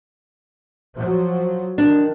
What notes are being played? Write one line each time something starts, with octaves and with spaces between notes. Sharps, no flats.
F3 F#3
D#3 D4